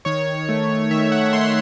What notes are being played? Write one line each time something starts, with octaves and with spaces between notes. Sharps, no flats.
D#3 C#5
A3
D#3 E5
F#5
A3 C6